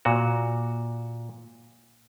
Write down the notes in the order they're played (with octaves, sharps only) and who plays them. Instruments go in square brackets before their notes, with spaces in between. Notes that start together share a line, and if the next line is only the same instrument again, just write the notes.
[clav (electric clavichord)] A#2 F#4